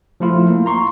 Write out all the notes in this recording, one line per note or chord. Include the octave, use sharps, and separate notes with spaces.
F3 A3 E4 F4
A#3
A#5 C6 C#6